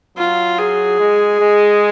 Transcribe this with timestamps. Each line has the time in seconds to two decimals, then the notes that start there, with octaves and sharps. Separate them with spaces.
0.17 F#3 F4
0.59 G#4
0.99 G#3
1.41 G#3